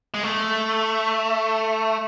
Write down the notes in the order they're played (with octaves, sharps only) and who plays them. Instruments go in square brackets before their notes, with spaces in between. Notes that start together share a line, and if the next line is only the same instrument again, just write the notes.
[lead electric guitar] G#3
A3